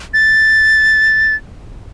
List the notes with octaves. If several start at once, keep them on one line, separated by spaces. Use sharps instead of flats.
A6